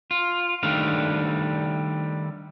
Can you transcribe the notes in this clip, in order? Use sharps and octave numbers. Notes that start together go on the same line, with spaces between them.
F4
D#3 G3 A3 D4 F5